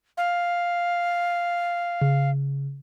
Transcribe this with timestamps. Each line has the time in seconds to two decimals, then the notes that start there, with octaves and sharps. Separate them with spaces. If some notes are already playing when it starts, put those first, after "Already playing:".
0.17 F5
2.01 C#3